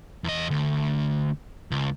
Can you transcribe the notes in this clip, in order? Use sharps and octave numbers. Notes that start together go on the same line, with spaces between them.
E2 D#5
D2
C#2